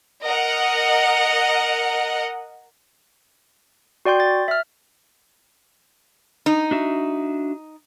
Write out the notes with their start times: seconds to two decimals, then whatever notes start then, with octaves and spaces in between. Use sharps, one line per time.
0.25 A#4 D#5 F#5
4.05 F#4 D5 G5 C6 G6
4.20 A6
4.48 E5 F6
6.46 D#4
6.71 D4 F#4 E5